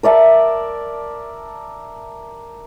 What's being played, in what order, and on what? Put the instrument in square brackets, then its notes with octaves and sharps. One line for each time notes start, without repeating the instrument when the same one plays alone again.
[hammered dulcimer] A#4 D5 E5 A5